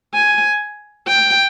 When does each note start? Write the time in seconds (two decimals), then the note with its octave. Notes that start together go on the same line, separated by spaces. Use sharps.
0.14 G#5
1.08 G5